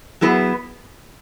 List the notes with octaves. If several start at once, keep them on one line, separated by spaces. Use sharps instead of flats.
F#3 B3 E4 G#4 B4